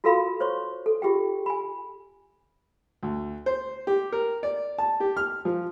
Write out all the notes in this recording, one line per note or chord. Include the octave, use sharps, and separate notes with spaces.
F4 F#4 A4 A#4 F5 B5
C5 C#5 C6 C#6
A4
F4 G4 G#4 G5
G#5 B5
D2
C5
G4
A#4
D5
A5
G4
F6
F3